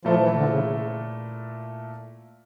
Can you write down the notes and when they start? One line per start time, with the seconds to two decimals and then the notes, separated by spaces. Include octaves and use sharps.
0.05 A#2 F3 A3 E4 A4
0.19 E3
0.34 D3
0.49 C#3